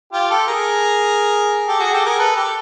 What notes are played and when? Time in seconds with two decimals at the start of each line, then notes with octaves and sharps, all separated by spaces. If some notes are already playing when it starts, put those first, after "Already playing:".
0.12 F4 G4
0.30 G4 A4
0.47 G#4 A#4
1.68 G4 A4
1.80 F#4 G#4
1.92 G4 A4
2.05 G#4 A#4
2.19 A4 B4
2.36 G4 A4